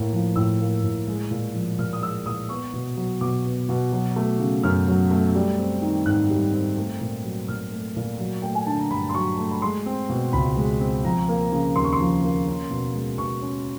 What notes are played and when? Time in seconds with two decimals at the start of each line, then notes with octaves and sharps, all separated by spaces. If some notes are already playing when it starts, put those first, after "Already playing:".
Already playing: A2 A#3
0.13 F3
0.36 A2 E6
0.60 A#3
0.84 A2
1.08 G#3
1.31 A#2
1.54 F3
1.79 A#2 F6
1.93 D#6
2.02 G#3 E6
2.26 A#2 D#6
2.49 B3 C#6
2.73 B2
2.97 F#3
3.21 B2 D6
3.45 B3
3.69 B2
3.92 F#3
4.16 A3
4.39 C#3
4.63 F#2 F6
4.87 F#3
5.11 A3
5.35 G3
5.59 C4
5.82 D#3
6.06 G#2 F#6
6.30 G3
6.53 C4
6.77 A3
7.01 A#2
7.24 F#3
7.48 A#2 F6
7.72 A3
7.96 A#2
8.20 F#3
8.42 A3 G5
8.55 G#5
8.66 D3 A5
8.79 A#5
8.91 G2 B5
9.09 C6
9.14 F#3 C#6
9.38 A3
9.51 B5
9.62 G#3 C6
9.86 C4
10.09 B2
10.33 C#2 B5
10.57 G#3
10.81 C4
11.04 F3 A#5
11.29 A#3
11.52 C#3
11.76 D#2 C6
11.84 C#6
11.93 C6
11.99 F3
12.23 A#3
12.47 C#4
12.70 B2
12.95 G#3
13.18 B2 C#6
13.42 C#4